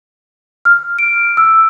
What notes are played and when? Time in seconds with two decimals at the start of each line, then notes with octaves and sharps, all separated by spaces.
0.65 F6
0.99 D7
1.37 E6